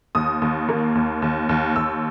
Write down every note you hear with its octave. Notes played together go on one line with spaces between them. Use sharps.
D#2 D#6
D#2
A#3
D#2
D#2
D#2
D#2 E6